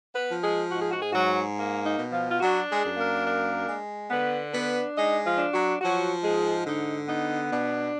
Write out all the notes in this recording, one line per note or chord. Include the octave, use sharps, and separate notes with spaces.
B3 B4
F3
G#3 G#4
G#2 F#4
G#4
F#4
G#4
G#2 F#3 F#4
A#3
D#4
B2
F3 F4
F4
F#3 D4 F#4
G#3 G#4
F#2
A#3 A#4
D4
G#3
D3 B3 B4
B3 D4 B4
G#3 D#4 D#5
F3 F4
D4
F#3 F#4
F3 F#3 F#4
G#2 G#3 G#4
D3 D#4
B3 D#4
B2 D4